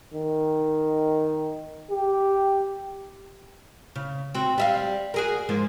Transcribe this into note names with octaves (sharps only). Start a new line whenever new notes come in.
D#3
G4
C#3
C4 F#4
G3 E5 F5
F#4 G#4 A#4
G#2 F3 A#3